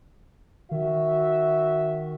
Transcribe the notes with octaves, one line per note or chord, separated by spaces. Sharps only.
D#3 F#4 E5